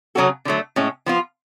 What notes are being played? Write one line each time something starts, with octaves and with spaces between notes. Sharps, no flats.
C#3 F#3 C#4 F#4 A4
D3 F#3 A3
A2 G#3 C#4
F3 B3 F4